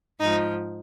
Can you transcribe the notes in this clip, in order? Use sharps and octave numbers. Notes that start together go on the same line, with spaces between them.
G#2 F3 D#4